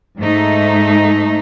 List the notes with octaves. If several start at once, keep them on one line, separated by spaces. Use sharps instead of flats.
G#2 A3 D#4